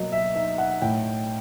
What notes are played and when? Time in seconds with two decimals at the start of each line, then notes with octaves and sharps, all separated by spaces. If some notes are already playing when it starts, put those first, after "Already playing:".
Already playing: B2 F#3 A#3 D#5
0.12 E5
0.35 D#4 E5
0.58 F#5
0.82 A2 G5